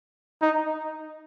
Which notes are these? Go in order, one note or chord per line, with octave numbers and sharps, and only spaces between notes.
D#4